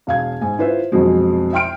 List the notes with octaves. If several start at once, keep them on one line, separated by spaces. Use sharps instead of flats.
E1 F5 G#6
G#2 G#5
E4 F4 B4 C5 E5
A#1 F2 B2 F#3 G#3
E5 G5 C6 F6 D7